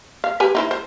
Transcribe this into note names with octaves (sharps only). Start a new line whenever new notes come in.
F5
G4 B4 G#5
D#4 E4 C5
C5